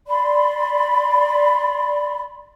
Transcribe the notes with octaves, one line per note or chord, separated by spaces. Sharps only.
D5 B5 C6